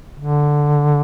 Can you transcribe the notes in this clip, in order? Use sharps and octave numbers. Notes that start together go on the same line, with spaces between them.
D3